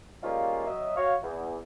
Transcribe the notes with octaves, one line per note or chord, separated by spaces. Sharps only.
G3 G#3 A#3 C#4 D#4 F4
F#3 D#5 E5
F#4 C#5 F5
E2